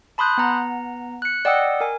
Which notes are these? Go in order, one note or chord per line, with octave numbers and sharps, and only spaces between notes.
A5 B5 C6 D#6 F#6 G6
B3 F#5 A#5
F#6 C#7
D5 D#5 F#5 G5 D#6 E6
A#4 G#5